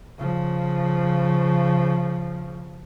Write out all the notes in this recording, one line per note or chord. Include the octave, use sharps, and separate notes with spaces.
C#3 F3